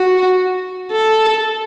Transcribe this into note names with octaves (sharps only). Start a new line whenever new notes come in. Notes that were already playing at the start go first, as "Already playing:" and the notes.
Already playing: F#4
A4